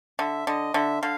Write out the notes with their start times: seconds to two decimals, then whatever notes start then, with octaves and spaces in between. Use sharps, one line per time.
0.19 D3 E5
0.47 D3 D#5
0.74 D3 E5
1.02 D3 F5